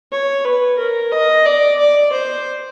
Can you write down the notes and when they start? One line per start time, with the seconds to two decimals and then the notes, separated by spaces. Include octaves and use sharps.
0.12 C#5
0.45 B4
0.78 A#4
1.12 D#5
1.45 D5
1.79 D5
2.12 C5